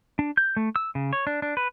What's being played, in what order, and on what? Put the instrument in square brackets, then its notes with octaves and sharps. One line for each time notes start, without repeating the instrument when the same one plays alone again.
[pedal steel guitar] D4
G6
A3
E6
C#3
C#5
D4
D4
B4